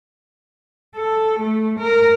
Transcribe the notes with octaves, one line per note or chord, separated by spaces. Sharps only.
A4
A3
A#4